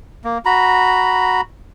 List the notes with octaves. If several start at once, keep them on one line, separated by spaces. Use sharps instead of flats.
A#3
F#4 A#5 B5